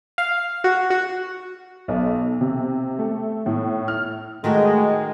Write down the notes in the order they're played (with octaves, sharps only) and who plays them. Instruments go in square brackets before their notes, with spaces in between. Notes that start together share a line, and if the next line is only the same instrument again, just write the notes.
[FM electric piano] F5
F#4
F#4
[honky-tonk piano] B1
B2
C3
A3
A2
F6
[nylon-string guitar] D#3 A3 F#4 [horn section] G#3